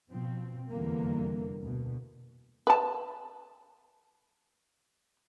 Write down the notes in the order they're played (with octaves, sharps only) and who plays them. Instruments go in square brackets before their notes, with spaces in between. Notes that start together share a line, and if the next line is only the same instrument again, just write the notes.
[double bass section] B2 F3 C4
F1 E2 D3 E3 G3 A#3
D2 B2
[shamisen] B4 A5